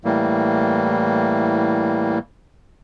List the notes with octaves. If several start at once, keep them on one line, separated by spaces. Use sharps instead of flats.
A2 E3 G3 A#3